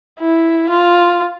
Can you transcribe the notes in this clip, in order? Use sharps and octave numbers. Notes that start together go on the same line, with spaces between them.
E4
F4